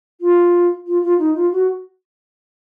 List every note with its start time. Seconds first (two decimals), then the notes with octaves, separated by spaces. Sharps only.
0.21 F4
0.87 F4
1.03 F4
1.18 D#4
1.35 F4
1.52 F#4